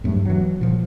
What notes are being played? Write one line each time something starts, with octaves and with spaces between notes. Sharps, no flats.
E2 G2 F#3 A3
E3 F#3
A#2 F3